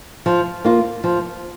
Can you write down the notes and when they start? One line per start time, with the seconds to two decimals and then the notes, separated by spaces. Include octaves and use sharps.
0.26 F3
0.65 A#3 F4
1.04 F3